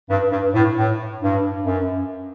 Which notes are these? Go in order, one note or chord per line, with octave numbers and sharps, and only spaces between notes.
G2
G2
A2
A2
G2
F#2